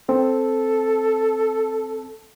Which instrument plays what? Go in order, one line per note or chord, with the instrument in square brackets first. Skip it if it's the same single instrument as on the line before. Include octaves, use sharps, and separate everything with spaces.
[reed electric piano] C4 [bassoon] A4